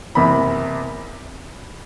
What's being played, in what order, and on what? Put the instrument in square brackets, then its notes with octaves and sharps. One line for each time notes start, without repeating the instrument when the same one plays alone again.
[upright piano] F#1 E2 C3 B5